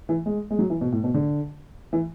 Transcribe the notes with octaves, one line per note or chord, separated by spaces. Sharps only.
E3
G#3
G#3
F#3
E3
B2
A2
B2
D3
E3